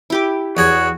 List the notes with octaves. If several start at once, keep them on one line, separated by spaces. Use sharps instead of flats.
E4 G4 D6
E2 F#4 G#4 C#5